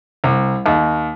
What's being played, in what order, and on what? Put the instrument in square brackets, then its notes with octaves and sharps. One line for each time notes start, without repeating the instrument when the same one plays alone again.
[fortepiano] C2
D#2